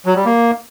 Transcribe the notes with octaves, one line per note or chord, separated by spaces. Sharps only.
F#3
G3
A#3